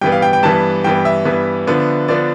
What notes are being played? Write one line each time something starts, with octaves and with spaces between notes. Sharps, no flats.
G2 E3 B3 G5
F5
G5
G5
G2 E3 B3 A5
G2 E3 B3 G5
E5
G2 E3 B3
D3 F3 B3 D4
D3 F3 B3 D4 D5